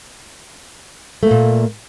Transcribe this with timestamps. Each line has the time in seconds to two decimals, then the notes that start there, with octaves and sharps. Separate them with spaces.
1.23 A3
1.27 A#3
1.31 A#2